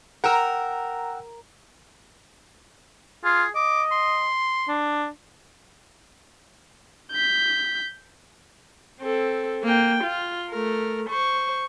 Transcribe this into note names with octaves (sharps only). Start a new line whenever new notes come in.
A#4 F#5 G5 E6
F4 G#4
D#5 D6
C6
D4
G6 B6
C4 A4
A#3 G5
F4
A3 A#4
C5 C#6